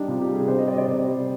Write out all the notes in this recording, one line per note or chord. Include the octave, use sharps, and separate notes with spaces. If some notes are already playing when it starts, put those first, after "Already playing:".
Already playing: G3 D4 D#4 G4
C3 F4
G4
G3
G#4
C3 C5
D#5
G3 D5
D#5
D5
C3
G3